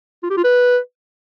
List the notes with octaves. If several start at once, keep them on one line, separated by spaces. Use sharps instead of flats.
F4
G4
F4
B4